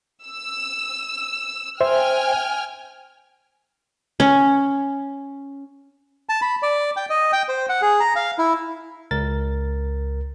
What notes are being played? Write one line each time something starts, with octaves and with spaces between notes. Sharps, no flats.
E6
C5 E5 G5 G#5 F6
C#4
A5
B5
D5
G5
D#5
G5
C5
F#5
G#4
A#5
F5
E4
C#2 A#4 A6